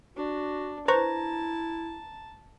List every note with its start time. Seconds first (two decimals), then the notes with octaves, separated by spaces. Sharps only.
0.17 D4 F#4
0.88 E4 B4 C5 A5 A#5 C#6